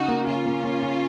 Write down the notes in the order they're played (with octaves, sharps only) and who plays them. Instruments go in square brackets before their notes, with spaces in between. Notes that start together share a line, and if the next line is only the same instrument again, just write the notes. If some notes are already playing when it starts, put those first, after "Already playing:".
Already playing: [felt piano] C#3 [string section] D#4 F#4
[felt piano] A#3
[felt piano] C#3 [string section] C#4 F4
[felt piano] A#3
A#3
C#3